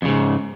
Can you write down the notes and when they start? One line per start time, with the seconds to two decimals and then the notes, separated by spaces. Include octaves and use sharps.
0.02 F2
0.05 C#3
0.08 G#2